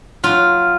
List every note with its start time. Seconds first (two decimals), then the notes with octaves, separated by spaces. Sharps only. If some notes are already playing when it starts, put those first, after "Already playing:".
0.23 F#3 F4